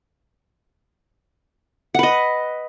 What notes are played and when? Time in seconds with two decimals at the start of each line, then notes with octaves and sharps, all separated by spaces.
1.94 F#5
1.99 B4
2.03 D#5